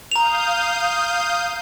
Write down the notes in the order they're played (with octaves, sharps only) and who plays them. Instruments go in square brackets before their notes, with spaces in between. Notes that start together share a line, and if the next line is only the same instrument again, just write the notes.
[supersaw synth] F5 D#6 G6 [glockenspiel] A#5 F7